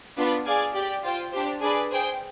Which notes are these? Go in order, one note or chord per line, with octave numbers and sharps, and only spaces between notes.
B3 D4 F4
G#4 D5 F5 G#5
G4 D5 G5
F4 C5 G5
D4 G4 C5
D4 G#4 B4 D5
G#4 C5 G5